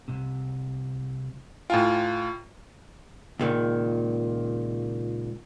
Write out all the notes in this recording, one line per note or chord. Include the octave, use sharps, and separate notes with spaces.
C2 G#2 C3
A2 F4 G5 G#5 A#5
C#2 A#2 D#3